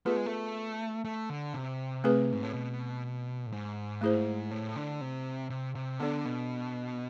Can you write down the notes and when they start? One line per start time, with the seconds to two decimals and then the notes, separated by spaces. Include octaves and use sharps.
0.06 A3 B3 F4 G#4 B4
0.17 G#3
0.26 A3
1.05 A3
1.29 D3
1.54 C3
2.04 A3 C4 G#4 B4
2.33 G#2
2.43 A2
2.53 B2
3.46 A2
3.52 G#2
4.01 A3 E4 G#4 C5
4.51 A2
4.76 D3
5.01 C3
5.50 C3
5.75 C3
6.00 D3 B3 D4 A4 D5
6.25 B2